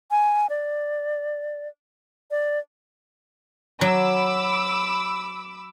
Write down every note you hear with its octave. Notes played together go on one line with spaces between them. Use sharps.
G#5
D5
D5
F#3 B5 D6 E6